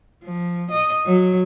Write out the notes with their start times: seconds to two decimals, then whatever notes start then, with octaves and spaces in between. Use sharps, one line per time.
0.23 F3
0.71 D#5
1.05 F#3